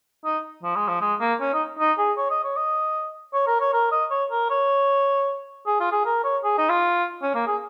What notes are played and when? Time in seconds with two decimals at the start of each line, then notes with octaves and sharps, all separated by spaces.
0.25 D#4
0.63 F3
0.76 G#3
0.88 F3
1.01 G#3
1.20 A#3
1.40 C#4
1.54 D#4
1.79 D#4
1.98 G#4
2.18 C#5
2.30 D#5
2.44 C#5
2.57 D#5
3.34 C#5
3.47 A#4
3.60 C#5
3.73 A#4
3.92 D#5
4.11 C#5
4.32 A#4
4.50 C#5
5.67 G#4
5.80 F4
5.92 G#4
6.06 A#4
6.24 C#5
6.44 G#4
6.58 D#4
6.69 F4
7.22 C#4
7.35 A#3
7.47 G#4